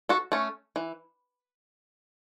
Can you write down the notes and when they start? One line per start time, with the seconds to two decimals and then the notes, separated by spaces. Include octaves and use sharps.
0.09 F#4 A4
0.32 A3 C#4
0.76 E3